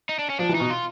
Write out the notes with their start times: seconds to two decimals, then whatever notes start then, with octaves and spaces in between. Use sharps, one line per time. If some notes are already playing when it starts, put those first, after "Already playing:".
0.09 D#4
0.19 D4
0.30 C#4
0.39 F3 D4
0.49 E3
0.55 D#4
0.60 B2
0.70 F4